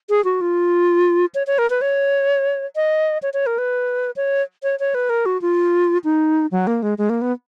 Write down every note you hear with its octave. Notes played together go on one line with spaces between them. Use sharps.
G#4
F#4
F4
C#5
C#5
A#4
B4
C#5
D#5
C#5
C#5
A#4
B4
C#5
C#5
C#5
B4
A#4
F#4
F4
D#4
F#3
A#3
G#3
G#3
A#3
B3